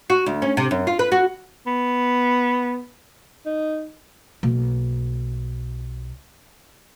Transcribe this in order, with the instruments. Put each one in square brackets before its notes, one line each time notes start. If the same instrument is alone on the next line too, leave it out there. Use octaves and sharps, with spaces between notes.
[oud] F#4
D2
C#4
C3
F#2
F4
B4
F#4
[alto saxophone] B3
D#4
[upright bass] B1 A#3